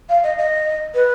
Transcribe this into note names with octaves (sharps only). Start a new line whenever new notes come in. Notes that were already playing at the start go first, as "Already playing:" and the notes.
F5
D#5
D#5
B4